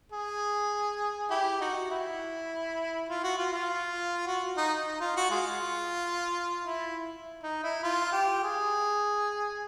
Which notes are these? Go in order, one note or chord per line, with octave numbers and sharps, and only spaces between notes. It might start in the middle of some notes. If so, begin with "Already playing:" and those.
G#4
E4 G4
D#4 F#4
E4
F4
F#4
F4
F4
F#4
D#4
D#4
F4
F#4
G#3 F4
E4
D#4
E4
F4
G4
G#4